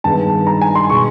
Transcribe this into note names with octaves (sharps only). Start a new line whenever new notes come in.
G2 D#3 G#3 B3 A5
A#5
G#5
C6
B2 G#3 C#6